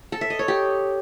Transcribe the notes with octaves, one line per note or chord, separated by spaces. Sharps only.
A4
E5
D#5
C#5
G4